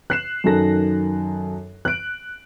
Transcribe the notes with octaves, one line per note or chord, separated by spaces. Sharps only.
F#6 C7 E7
F#2 D#3 D#4 A4 A#6
F#6 D7